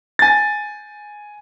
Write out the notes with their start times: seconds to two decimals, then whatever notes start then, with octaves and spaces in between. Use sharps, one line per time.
0.19 G#5 A6